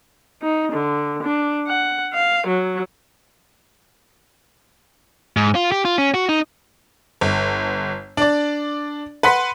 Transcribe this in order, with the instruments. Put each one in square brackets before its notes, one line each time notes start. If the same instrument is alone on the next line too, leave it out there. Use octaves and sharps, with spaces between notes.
[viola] D#4
D3
D4
F#5
F5
F#3
[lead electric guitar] G#2
F4
G4
F4
C#4
F#4
D#4
[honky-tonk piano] G1
D4 D5
B4 F#5 C6 B6